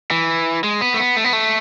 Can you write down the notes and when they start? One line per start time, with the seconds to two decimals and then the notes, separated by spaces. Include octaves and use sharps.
0.11 E3
0.64 G#3
0.81 B3
0.94 A3
0.99 B3
1.17 A3
1.24 B3
1.33 A3